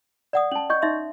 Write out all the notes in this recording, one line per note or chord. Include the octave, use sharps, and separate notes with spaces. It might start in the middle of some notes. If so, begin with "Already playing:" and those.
D5 F#5 D#6
C#4 A5 F#7
D#5 C#6 G6
D#4 E5 C6